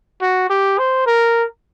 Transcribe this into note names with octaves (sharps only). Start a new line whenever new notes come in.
F#4
G4
C5
A#4